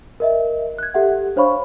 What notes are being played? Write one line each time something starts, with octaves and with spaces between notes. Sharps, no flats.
A#4 D#5 E5
F#6 G#6
G4 A4 E5 F#5
D4 C5 C#5 F5 B5 C#6